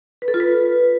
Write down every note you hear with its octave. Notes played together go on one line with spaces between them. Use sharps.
B4
A4
F4
B4